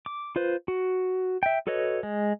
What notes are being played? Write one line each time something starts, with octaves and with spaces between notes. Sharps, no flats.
D6
F4 B4 C5
F#4
E5 G5
F#4 A4 B4 C#5 D#5
G#3